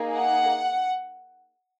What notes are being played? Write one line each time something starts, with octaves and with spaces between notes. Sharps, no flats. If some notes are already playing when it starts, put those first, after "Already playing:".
Already playing: A#3 D#4 G#4
F#5